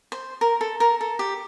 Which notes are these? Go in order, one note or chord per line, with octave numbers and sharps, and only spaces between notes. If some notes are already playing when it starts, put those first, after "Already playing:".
C5
A#4
A4
A#4
A4
G4